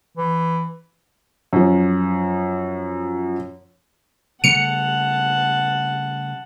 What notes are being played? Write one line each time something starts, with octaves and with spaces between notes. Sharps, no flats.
E3
F#2 F3
C#3 G3 A3 F#5 A5 C#7 F7